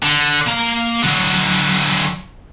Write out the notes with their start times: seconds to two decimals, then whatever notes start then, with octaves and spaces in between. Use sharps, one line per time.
0.03 D3
0.47 A#3 A#5
1.02 D3 F#3